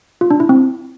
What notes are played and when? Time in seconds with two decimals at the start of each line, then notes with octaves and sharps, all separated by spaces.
0.21 F4
0.31 D4
0.40 E4
0.49 C4